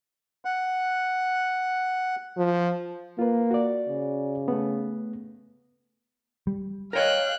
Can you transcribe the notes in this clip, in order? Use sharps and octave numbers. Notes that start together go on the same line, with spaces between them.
F#5
F3
A#3 F4 B4
F#4 D5
C#3
A3 B3
G3
A#4 C#5 D#5 F5 G5 F#6